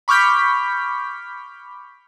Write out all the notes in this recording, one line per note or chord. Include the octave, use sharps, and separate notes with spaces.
B5 C#6 D6 F6 G6 B6